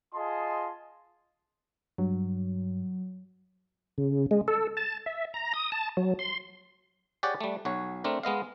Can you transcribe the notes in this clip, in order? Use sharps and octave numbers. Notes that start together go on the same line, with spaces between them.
F4 G#4 D#5 A5 C6
G2 F#3
C#3
G#3
A4
A5
E5
A#5
D#6
A5
F#3
C6
G4 G#4 C#5 D5 F#5
G3 A3
B1 F#4 C#5
A3 C4 D4 A#4
G#3 B3 D#5 F5